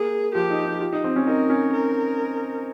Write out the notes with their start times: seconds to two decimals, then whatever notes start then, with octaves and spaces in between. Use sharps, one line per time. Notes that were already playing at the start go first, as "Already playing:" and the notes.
Already playing: A#3 G#4
0.35 F3 G4
0.51 D#4
0.66 D#4
0.81 F4
0.93 D#4
1.04 C4
1.16 C#4
1.27 D#4 A#4
1.50 C#4
1.73 A#4